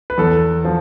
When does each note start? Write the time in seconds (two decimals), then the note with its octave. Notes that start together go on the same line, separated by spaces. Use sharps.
0.10 B4
0.18 E2 A4
0.65 F3